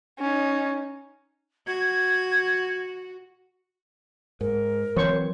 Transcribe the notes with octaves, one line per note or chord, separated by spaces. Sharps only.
C#4 D#4
F#4 G#6
G#2 A#4
E3 F#3 C4 C5 C#5 C#6